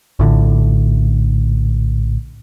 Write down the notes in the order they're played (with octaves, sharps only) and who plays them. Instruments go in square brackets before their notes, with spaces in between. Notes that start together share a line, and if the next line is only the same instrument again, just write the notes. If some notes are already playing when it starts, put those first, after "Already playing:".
[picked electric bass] A#1 A2 D3